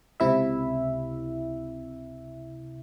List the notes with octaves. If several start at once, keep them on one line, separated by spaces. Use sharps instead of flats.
C#2 C3 E4 E5